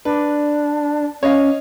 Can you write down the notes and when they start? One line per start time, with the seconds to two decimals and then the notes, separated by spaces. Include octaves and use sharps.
0.05 D4 B4
1.23 C#4 C#5 D#5 F5